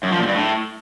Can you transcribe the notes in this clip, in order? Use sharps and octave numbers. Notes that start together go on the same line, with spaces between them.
F#2
F3
A#2
G2
A2